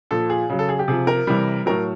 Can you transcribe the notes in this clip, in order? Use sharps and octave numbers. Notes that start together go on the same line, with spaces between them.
A#2 F3 A4
G#4
C#3 F#3
A4
G#4
G4
C3 F3 G#4
A#4
C3 E3 G3
A2 F#3 A#4